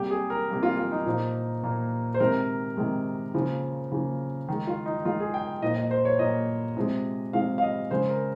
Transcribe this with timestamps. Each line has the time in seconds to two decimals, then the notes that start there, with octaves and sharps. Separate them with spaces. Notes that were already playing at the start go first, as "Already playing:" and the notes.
Already playing: C3 G3 A#3 G4
0.11 G#4
0.30 A#4
0.49 C3 G3 A#3 G4
0.63 F4
0.77 F4
0.92 D#4
1.06 A#2 F3 A#3
1.63 A#2 F3 A#3
2.14 C5
2.20 C3 D#3 G#3 A#4
2.77 C3 D#3 G#3
3.34 C#3 F3 A#3
3.92 C#3 F3 A#3
4.48 D#3 G#3
4.67 F4
4.86 D#4
5.05 D#3 G#3 F4
5.20 G#4
5.34 G5
5.62 A#2 F3 A#3 D#5
5.76 D#5
5.91 C5
6.05 C#5
6.19 A#2 F3 A#3 D#5
6.77 C3 F3 G#3
7.33 C3 F3 G#3 F5
7.58 F5
7.62 D#5
7.91 C#3 G#3 C5
8.09 A#4